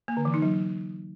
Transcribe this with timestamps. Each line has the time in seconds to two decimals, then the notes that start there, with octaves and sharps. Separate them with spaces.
0.08 A#3
0.17 D3
0.25 E3
0.34 D#4
0.42 F#3